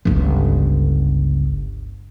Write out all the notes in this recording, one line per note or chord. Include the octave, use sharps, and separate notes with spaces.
G1 C#2